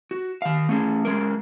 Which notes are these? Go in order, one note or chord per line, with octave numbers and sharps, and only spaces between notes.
F#4
D#3 F5
A3 C#4 G#4
G#3 C#4 A#4